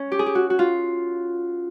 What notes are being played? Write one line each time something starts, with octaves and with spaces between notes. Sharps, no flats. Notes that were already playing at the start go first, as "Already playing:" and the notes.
Already playing: C#4
G4
G#4
G4
F#4
F#4
F4